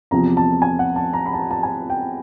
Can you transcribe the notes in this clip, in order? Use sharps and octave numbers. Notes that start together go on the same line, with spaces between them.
E2 C3 F3 A#5
A5
G#5
F#5
A5
A#5
B5
A5
A#5
A5
G#5
G5